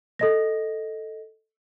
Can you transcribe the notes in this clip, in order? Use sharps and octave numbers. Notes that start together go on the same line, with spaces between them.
A4 D#5 A#6